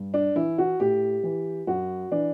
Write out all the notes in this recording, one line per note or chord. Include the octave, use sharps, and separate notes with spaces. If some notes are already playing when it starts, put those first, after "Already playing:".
Already playing: G2
D4
E3 E4
F#4
A2 G4
E3
F#2 F#4
E3 D4